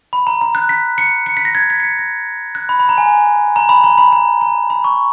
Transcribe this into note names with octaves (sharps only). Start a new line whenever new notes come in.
B5
A#5
A#5
F#6
B6
C#7
C#7
B6
A#6
G#6
B6
C#7
B6
A#6
F#6
B5
B5
A#5
G#5
A#5
B5
A#5
B5
A#5
A#5
B5
C#6